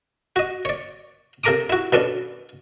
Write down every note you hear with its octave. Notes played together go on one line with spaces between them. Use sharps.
F#4 D#5
C#5 D5
C3 A4 A#4 A#5 D6 D#6
E4 F#4
B2 B3 C#4 D4 A4